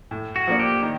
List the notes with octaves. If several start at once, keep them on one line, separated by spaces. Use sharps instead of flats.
A2
F#4
F3 A#3 D4
G4
D#3